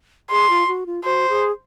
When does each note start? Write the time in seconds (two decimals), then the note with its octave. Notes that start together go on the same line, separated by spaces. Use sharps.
0.30 G#4 C6
0.50 F4
0.68 F#4
0.86 F4
1.04 F#4 C5
1.29 G#4